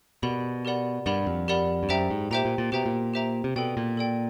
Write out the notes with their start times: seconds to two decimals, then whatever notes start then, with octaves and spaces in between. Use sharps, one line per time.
0.22 B2 G4 A#4 D5 F#5 B5
0.65 G4 A#4 D5 F#5 B5
1.06 G2 G4 A#4 D5 F#5 B5
1.26 F2
1.48 G4 A#4 D5 F#5 B5
1.83 G2
1.89 F#2 G4 C5 E5 G5 A#5
2.10 G#2
2.31 A#2 G4 C5 E5 G5 A#5
2.45 A#2
2.58 A#2
2.72 B2 G4 C5 E5 G5 A#5
2.86 A#2
3.14 G4 C5 E5 G5 A#5
3.44 C3
3.56 B2 A4 D5 G5
3.77 A#2
3.97 A4 D5 G5